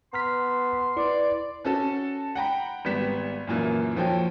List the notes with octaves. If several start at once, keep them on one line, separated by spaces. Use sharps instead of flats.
B3 A#5 C6 F6 B6
E4 B4 D5
C#4 F#4 A4
F#5 G5 A#5 B5
G#1 G3 B3 B6 E7
F#2 A#2 E3 A#3
D#2 F3 F#4 A4 C#5 G5